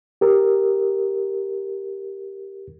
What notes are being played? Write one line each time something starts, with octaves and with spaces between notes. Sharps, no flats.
G4 A#4